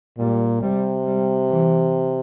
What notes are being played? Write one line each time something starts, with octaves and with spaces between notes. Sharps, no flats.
A#2 G3
C3 G3
G3
E3